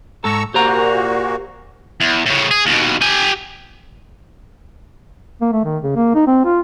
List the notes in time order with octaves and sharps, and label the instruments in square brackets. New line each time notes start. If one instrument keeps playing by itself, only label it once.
[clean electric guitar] G#2 A4 [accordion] A#5 C#6 E6
[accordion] A#2 A#3 F#4 [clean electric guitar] G4 C5 A#5
[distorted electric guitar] E2
A2 C#3
G#4
D#2 B2
G4 G#5
[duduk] A#3
A3
D#3
C#3
A#3
D#4
C4
F4